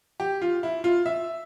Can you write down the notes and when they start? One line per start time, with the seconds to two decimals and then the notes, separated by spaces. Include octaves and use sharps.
0.20 G4
0.42 F4
0.63 E4
0.84 F4
1.06 E5